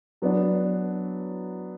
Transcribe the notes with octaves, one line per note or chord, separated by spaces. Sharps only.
F#3 B3 D4